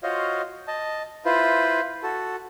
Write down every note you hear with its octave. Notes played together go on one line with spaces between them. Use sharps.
F4 F#4 C5 C#5 D#5 F5
D#5 A5
E4 F4 B4 C5
F#4 A4